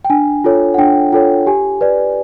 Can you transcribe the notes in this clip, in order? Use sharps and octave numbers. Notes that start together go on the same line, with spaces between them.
G5
D4 G#5
F4 A4 C#5
F#5
D4 G5
F4 A4 C#5 G5
G4 G#5
B4 D5